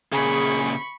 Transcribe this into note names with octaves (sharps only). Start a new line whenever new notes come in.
A#2 C#3 G#4 B5 C#6